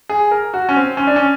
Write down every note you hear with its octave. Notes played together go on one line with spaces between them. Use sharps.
G#4
A#4
F#4
C#4
C4
C#4
D4
C#4